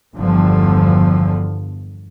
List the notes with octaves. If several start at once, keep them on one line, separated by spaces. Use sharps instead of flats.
G1 E2 G2 D3 F3